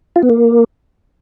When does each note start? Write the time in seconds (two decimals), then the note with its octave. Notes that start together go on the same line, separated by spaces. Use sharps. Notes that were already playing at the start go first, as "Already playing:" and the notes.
0.16 F4
0.23 B3
0.30 A#3